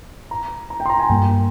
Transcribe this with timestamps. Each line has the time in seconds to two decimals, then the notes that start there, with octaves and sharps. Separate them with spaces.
0.31 A#5
0.70 A#5
0.80 G5
0.86 C6
0.90 A#5
1.00 G#5
1.10 G2 G3 A#3 G5